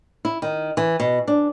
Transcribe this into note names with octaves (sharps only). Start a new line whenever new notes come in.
E4
D#3
E3
B2
D4